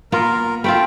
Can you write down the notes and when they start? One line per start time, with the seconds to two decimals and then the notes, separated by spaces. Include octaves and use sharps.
0.12 A#3 B3 F4 A#4
0.64 A3 C4 F4 G5 B5